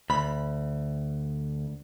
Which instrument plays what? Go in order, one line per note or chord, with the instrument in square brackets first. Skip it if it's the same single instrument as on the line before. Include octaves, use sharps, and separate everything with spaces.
[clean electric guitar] D2 [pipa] B5